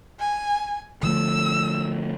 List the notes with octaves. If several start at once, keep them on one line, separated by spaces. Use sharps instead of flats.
G#5
D3 F3 A3 E6